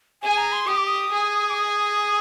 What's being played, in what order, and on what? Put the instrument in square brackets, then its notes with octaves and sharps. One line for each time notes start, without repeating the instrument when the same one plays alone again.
[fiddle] G#4 [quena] G#5
[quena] A#5
C6
[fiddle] G4 [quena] D#6
[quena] D6
D#6
[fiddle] G#4
[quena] D6
D#6